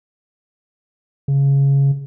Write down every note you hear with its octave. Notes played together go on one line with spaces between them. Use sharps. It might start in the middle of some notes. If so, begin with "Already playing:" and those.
C#3